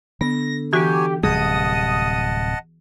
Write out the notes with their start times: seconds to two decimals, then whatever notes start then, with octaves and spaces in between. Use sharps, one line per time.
0.21 D3 B3 A#6
0.73 E3 F#3 F#4 G4 C#5 G#5
1.23 D1 C3 G3 G#4 D#5 F#5 A5 D#6